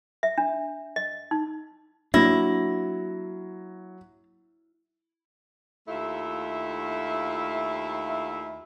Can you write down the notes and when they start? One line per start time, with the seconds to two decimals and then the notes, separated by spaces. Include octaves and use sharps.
0.23 E5
0.38 D4
0.96 D#5
1.31 D#4
2.14 F#3 A#3 D4 E4 A#6
5.88 D#2 A3 E4 F4 E5